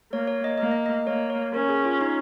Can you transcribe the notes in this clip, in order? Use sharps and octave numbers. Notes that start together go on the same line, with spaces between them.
A#3 C#5
C#5
D#5
A#3 D#5
D#5
D#5
A#3 C#5
C#5
C#4 A#4
G#4
F4
D#4